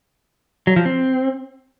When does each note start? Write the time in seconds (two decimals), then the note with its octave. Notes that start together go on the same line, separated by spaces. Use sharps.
0.67 F#3
0.76 F3
0.86 C4